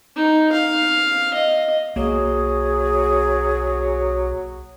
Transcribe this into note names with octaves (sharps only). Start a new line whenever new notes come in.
D#4
F5
D#5
B1 F#3 A#3 G#4